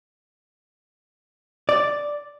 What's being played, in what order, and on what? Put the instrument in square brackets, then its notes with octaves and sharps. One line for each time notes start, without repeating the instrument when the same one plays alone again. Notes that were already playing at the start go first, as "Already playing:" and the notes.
[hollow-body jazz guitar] D5